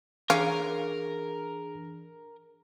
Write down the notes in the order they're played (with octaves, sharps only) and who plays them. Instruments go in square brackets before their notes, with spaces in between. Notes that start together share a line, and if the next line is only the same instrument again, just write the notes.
[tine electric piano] E3 D4 G#4 [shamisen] C#4 [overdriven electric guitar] A#4 [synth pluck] F5 C#6 D6